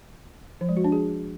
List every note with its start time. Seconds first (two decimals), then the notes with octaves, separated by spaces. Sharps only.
0.61 F3
0.69 G#3
0.77 F#4
0.84 D4
0.92 G#4